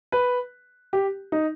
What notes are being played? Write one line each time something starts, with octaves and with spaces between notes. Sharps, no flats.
B4
G4
D#4